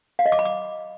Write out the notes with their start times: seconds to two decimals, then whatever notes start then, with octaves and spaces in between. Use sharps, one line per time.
0.19 F5
0.26 D#5
0.32 D6
0.39 B5
0.45 D6